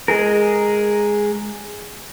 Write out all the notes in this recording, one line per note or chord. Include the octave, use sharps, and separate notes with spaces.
G#3 G#4 A#4